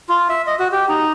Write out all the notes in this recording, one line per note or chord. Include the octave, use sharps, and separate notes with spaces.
F4
E5
D#5
F#4
G4
D#4